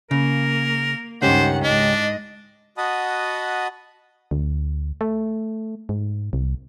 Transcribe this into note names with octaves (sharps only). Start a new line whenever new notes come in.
C#3 A#3 A#4
C#2 G2 D#3 C#4 G4 C5 F#5
G#2 D4 D#5
F#4 D#5 F#5 A5 B5 D#6
D2
A3
G#2
C2